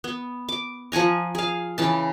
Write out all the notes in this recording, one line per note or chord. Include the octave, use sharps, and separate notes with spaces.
B3
D6
F3 F#5 G#5 A#5
G#4 F5
C#3 E3 A5